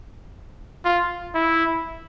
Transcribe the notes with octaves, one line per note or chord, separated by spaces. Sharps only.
F4
E4